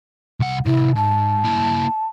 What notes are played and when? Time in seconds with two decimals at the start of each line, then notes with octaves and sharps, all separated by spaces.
0.40 C2 F#5
0.66 A2 C3 E4
0.95 G#2 A5
1.44 A#3 E4